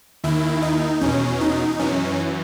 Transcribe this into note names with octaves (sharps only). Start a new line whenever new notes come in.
D#2 D#3 E4
D#4
E2 B2 C#4
D#4
F#2 E3 C#4